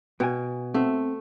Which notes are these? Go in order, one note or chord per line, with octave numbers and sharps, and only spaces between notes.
B2 B3 G5 G#5
A3 B3 C4